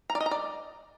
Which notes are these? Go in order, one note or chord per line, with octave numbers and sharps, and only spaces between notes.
A#5
D5
D#5
A#5
D5